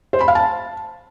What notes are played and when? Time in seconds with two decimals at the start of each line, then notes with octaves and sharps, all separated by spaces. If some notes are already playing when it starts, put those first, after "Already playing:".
0.13 C5
0.21 B5
0.28 F5
0.35 A5